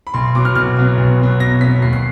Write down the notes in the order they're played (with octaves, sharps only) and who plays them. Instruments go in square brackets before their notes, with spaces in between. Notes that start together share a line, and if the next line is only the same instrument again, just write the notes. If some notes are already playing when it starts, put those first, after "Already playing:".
[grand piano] B5
B1 C6
B2 F#3 B3 D6
F6
B1 F6
B2 F#3 B3
B1
B2 F#3 B3
B1 A#6
B2 F#3 B3 B6
D#2 C7
C7